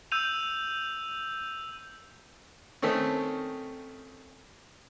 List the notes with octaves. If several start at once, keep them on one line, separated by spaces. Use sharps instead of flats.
E6 G6 D#7 F7
D#3 A3 C4 C#4